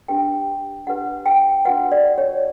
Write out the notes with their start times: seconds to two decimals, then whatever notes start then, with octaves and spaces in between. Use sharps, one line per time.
0.08 D4 G4 B4 G5
0.87 D4 G4 B4 F#5
1.26 G5
1.65 D4 F#4 B4 F#5
1.92 D5
2.18 C#5